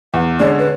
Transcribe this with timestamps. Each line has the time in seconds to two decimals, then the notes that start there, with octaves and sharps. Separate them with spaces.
0.14 E2 F#5
0.40 D3 G#3 C#4 D5
0.59 B4